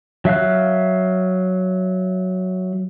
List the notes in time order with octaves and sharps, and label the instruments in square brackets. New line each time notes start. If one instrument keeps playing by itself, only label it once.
[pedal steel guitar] F#3 E5 F5 F#6